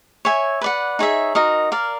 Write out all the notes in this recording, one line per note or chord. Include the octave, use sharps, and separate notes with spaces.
C#5 E5 G#5
B4 D5 F#5
D#4 G#4 C#5 E5
D#4 F#4 A#4 D#5
A#4 D5 F5